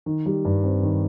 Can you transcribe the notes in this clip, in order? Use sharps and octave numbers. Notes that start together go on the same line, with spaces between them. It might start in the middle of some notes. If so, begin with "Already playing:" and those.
D#3
G3
G2
C4
D#3